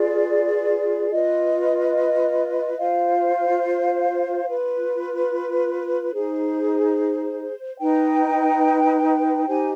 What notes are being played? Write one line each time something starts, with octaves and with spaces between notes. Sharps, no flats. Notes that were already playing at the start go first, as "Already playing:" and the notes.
Already playing: F4 G#4 B4 D5
F4 B4 D#5
F4 C5 F5
F4 B4
D#4 G#4 C5
D#4 B4 G5
D#4 G4 C5 G#5